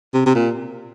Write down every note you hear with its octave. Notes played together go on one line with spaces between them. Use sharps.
C3
C3
A#2